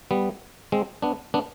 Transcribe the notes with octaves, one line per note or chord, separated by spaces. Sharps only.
G3 B3
G#3 C4
B3 D4
B3 D4